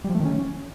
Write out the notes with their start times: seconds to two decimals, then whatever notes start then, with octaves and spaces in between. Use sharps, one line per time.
0.04 G3
0.10 F3
0.15 A3
0.20 D#3
0.25 C#4